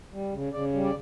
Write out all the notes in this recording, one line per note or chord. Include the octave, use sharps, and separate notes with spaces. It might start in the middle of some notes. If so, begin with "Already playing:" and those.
G3
C#3
C#3 D5
G3
D5